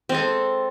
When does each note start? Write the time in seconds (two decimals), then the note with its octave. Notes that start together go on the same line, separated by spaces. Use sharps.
0.09 C4
0.12 G#3
0.14 A4